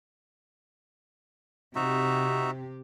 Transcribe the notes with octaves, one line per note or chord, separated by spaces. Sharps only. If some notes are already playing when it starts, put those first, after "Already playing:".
C3 D#4 F#4 G4 E5